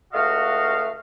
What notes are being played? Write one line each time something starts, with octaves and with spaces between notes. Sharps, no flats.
C#2 A3 F#4 D#5 F5